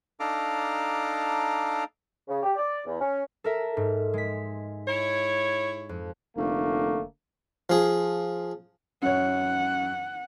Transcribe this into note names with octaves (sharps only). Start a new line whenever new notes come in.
D4 D#4 A4 F5 A#5 D6
C#3
G4
D5
E2
C#4
A4 A#4 E5
G#2
G#3 B6
E4 C#5
F2
F1 D3 A3 A#3
F3 G#4
F#2 C#5 F#5